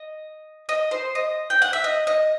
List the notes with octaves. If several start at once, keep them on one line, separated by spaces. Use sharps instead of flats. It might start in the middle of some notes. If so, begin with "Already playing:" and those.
Already playing: D#5
D#5
C5
D#5
G5
F#5
E5
D#5
D#5